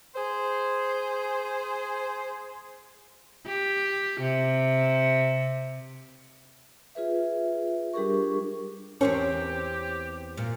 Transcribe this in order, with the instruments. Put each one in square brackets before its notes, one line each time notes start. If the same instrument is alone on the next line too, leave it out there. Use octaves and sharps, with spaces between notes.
[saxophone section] G#4 C5
[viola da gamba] G4
C3
[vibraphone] F4 G#4 B4 E5
G3 D4 G4 G#4 A#4 C#6
[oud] E2 C4 C#5 [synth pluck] C#4 A#4 [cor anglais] G4
[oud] A#2